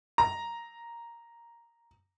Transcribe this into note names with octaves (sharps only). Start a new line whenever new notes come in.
A#5